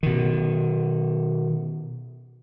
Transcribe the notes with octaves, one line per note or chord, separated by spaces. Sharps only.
B2 D#3